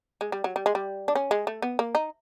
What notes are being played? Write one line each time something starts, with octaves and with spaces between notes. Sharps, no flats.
G#3
G3
F#3
G3
G#3
G3
D4
C#4
G#3
A3
B3
A#3
D#4